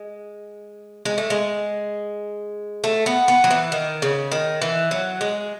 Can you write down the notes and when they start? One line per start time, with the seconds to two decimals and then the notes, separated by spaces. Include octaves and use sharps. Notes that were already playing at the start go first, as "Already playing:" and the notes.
Already playing: G#3
1.05 G#3
1.18 A3
1.30 G#3
2.84 A3
3.06 B3
3.28 B3
3.44 F#3
3.50 E3
3.72 D#3
4.02 C#3
4.32 D#3
4.62 E3
4.91 F#3
5.21 G#3